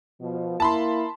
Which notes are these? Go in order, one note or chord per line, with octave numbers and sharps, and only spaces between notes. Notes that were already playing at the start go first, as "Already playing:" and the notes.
B2 F3
A#3 E4 A5 B5 C6